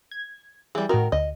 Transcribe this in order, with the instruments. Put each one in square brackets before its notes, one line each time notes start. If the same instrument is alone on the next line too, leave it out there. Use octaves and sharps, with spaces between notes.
[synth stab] G#6
[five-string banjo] E3 G3 [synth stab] G#4
[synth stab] A2 F#4 [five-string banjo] D#3 A#4
[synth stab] D2 [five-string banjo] D#5